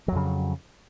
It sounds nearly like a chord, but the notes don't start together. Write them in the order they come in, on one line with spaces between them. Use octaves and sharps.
F#3 F2 C#3